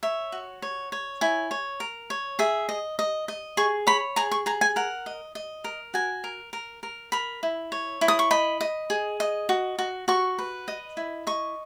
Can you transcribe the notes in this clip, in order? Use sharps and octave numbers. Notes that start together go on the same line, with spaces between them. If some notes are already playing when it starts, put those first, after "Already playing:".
C#5 E5
F#4
C#5
C#5
E4 G#5
C#5
A#4
C#5
G#4 E5
D#5
D#5
D#5
G#4 C#6
C#5 B5
G#4 A#5
C#6
G#4 A#5
G#5
A#4 F#5
D#5
D#5
A#4
F#4 G#5
A#4
A#4
A#4
A#4 B5
E4
C#5
E4
D#6
C#6
D#5 B5
D#5
G#4
D#5
F#4
F#4
F#4 C#6
B4
D#5
E4
D#5 C#6